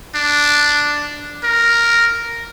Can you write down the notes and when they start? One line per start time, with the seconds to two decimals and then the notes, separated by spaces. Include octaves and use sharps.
0.15 D4
1.44 A#4